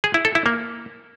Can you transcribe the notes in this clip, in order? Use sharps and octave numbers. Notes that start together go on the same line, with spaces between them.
G#4
E4
A4
E4
A#3